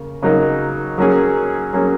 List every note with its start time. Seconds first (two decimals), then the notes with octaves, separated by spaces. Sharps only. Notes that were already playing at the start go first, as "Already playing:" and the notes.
Already playing: C#3 A#3
0.22 C#3 F#3 A#3 D#4 A#4
0.98 F#3 A#3 C#4 G#4
1.73 F#3 A#3 C#4 G#4